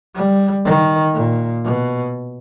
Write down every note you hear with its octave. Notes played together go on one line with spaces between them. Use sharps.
G3
D#3
A#2
B2